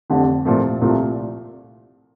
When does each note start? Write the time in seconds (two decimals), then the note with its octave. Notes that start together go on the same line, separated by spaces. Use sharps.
0.10 F1 F2 D3
0.45 C2 A#2 F3 A3
0.82 C2 A#2 F3 A3